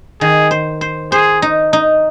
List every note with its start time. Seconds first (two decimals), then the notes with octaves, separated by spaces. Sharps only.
0.21 D#3 G#4
0.51 C5
0.81 C5
1.12 G#4 C5
1.42 D#4
1.73 D#4